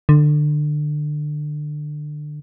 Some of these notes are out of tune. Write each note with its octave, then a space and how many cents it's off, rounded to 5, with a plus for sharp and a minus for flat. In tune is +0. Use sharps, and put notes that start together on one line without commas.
D3 +25